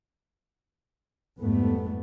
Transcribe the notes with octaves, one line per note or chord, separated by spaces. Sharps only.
F2 G#2 G3 A3 B3